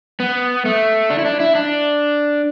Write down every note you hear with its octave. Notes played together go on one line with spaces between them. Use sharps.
B3
A3
D4
E4
D4
E4
D4